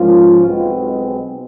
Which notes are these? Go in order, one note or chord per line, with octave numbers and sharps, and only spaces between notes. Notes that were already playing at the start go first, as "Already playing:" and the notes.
Already playing: G#2 F3 A#3 C#4 F4
B1 B2 G#3 C4